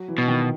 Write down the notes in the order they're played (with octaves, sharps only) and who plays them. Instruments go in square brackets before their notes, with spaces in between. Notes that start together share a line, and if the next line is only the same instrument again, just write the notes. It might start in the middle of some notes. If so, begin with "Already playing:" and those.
Already playing: [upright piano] F#3
E3
[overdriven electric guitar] B2
[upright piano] D#3